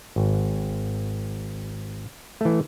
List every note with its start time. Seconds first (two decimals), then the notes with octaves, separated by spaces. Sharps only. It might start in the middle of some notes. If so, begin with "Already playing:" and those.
0.16 G#1
2.41 E3 A3